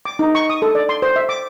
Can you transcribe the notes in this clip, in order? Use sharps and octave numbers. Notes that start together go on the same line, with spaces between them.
D6
D#4
C#6
D#6
A4
D5
C6
C5
E5
D6